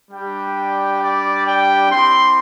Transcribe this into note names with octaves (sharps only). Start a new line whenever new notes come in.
G3 D4 G4 G5
D5
G5
C4 E4 G4 C6